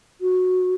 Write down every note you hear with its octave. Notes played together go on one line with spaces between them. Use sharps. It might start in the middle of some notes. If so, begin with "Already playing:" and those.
F#4